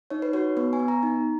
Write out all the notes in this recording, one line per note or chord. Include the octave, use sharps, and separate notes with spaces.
D#4 C#5
B4
F#4 C#5
B3 B4
G#5
B3
A#5
D#4